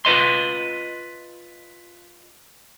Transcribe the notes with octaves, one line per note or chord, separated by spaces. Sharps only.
F4 B4 D#5 C6